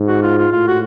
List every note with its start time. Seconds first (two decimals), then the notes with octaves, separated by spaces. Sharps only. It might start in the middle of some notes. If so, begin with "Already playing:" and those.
Already playing: G#2
0.08 F#4
0.23 F4
0.38 F4
0.52 A2 F4
0.68 F#4